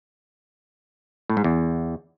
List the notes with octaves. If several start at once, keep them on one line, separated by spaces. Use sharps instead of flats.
A2
G#2
E2